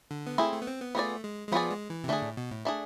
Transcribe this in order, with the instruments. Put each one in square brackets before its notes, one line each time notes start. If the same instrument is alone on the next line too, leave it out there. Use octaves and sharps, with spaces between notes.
[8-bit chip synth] D3
B3
[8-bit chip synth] A3 [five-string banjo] C4 E4 G#4
[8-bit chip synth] A3
B3
C4
B3
[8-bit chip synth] A3 [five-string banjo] B3 F4 G#4 D5
[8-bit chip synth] G#3
G#3
[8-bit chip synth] F3 [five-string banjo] B3 F4 G#4 D5
[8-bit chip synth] G#3
E3
C3
[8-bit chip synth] D3 [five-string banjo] A3 D4 G#4
[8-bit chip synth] A2
B2
A2
[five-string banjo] A3 D4 G#4